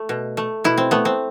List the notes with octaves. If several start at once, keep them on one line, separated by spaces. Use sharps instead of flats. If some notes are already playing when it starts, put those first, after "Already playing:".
Already playing: A3
B2
A3
B2 E4
C4
A3 B3
C4